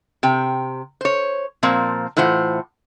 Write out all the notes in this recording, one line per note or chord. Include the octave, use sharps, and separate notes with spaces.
C3 G5
C5 C#5
A#2 F3 A#3 C4
A2 E3 F4 C5 F#5